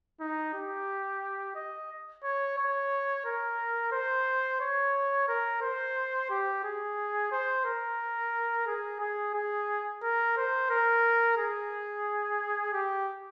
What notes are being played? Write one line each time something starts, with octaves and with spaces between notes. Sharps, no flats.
D#4
G4
D#5
C#5
C#5
A#4
C5
C#5
A#4
C5
G4
G#4
C5
A#4
G#4
G#4
G#4
A#4
C5
A#4
G#4
G4